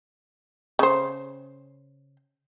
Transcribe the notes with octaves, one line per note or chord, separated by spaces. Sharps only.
C#3 C5